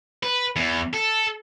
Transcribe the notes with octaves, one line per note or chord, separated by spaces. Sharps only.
B4
E2
A4